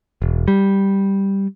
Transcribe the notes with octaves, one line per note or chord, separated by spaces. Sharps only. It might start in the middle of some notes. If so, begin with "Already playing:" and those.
E1
G3